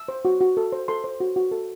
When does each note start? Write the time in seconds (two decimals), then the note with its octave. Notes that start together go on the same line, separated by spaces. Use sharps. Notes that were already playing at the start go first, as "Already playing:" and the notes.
Already playing: E6
0.08 C5
0.25 F#4
0.41 F#4
0.57 A4
0.72 C5
0.88 A4 C6
1.04 C5
1.20 F#4
1.36 F#4
1.51 A4